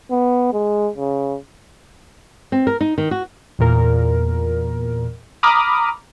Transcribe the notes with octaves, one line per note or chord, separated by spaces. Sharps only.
B3
G#3
C#3
C4
A#4
D#4
D#3
F#4
E2 A#2 A#4
A#5 B5 D6 D#6 F6